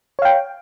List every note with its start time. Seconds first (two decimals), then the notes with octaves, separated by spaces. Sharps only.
0.19 C#5
0.22 F5
0.25 G5